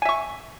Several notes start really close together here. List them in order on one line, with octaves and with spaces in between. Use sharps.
G#5 E5 C#6